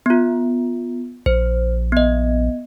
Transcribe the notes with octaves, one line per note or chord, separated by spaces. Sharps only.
B3 F4
A#1 C5
B3 D#5